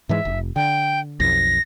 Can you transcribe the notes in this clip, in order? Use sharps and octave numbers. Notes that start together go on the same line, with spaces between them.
G#2 E3 G#3 E5
F1
D3 G5
B1 F2 A#6